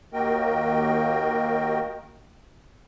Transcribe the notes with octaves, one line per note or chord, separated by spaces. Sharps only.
D#2 A#3 F#4 A#4 D#5 G5